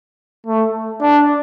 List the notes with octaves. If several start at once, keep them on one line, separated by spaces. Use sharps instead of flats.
A3
D4